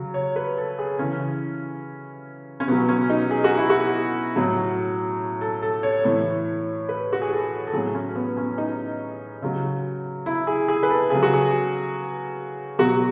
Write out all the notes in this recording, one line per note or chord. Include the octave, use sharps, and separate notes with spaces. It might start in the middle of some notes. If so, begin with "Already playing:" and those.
Already playing: C#3 F#3
C#5
B4
A4
G#4
C#3 E3 C#4
C#4
B2 F#3 B3
C#4
D#4
G#4
F#4
E4
F#4
A2 F#3
A4
A4
C#5
A2 E3 C#5
B4
F#4
G#4
A4
A4
A2 F#3 G#4
C#4
B3
C#4
D#4
C#3 F#3
E4
G#4
G#4
B4
A4
C#3 F#3 G#4
F#4
G#4
B2 F#3 F#4